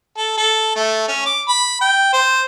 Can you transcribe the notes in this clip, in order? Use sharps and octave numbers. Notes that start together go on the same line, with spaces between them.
A4
A4
A3
C#4
D6
B5
G5
C5